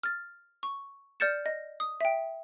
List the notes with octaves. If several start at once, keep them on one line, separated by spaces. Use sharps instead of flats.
F6 A6
C#6
D5 F6 G6 A6 C#7 E7
D#5
D#6
E5 G5